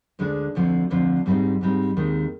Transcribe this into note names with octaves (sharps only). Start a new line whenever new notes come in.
D2 D3 G#3 D4
D2 D3 F3 C4
D2 D3 F3 C4
G#2 G3 C4 D#4
G#2 G3 C4 D#4
D#2 D#3 G#3 C4